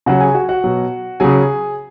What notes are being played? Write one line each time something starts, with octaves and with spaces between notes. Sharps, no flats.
C#3 F#3 F#4 F#5
G#4 G#5
F#4 F#5
F#4 F#5
B2 F#3
C#3 F#3 G#4 G#5